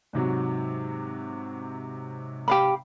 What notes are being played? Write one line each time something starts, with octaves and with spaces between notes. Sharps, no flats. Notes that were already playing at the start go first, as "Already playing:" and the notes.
G#2 C3 F#3
G4 F5 B5